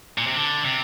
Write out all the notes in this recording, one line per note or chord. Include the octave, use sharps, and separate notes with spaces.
A#2
C3
D3
C3